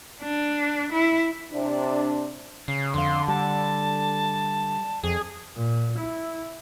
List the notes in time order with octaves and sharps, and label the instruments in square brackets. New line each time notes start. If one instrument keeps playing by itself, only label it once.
[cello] D4
E4
[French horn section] C3 D4
[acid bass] C#3 [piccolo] C7
[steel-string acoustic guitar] F2 F5 [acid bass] D3 [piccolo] C6
[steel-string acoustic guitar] G3 [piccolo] A5
[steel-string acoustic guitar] F2 [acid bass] G#4
[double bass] A#2
E4